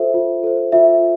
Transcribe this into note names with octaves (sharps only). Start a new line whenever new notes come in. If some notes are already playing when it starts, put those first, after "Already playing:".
Already playing: F4 A4 C5 E5
F4
A4 C5
F4 E5